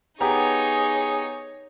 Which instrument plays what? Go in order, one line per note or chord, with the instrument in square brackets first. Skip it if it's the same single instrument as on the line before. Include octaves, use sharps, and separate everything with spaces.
[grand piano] B3 G4 A#5 [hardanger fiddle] D#4 C#5 [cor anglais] G#4